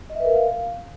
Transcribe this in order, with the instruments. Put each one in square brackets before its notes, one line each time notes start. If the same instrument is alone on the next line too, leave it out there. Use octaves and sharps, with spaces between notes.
[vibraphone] D#5
E5
B4
A#4
F5